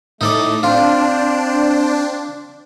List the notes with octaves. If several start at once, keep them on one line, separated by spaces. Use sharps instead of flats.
A2 A3 D#4 A4 D5
C4 D4 F4 C5